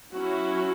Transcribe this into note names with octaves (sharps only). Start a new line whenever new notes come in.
F#3 C#4 E4 F#4